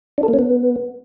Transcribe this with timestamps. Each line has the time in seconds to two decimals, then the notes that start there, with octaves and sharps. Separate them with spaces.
0.18 D4
0.23 A4
0.28 A#3
0.33 C#4
0.39 B3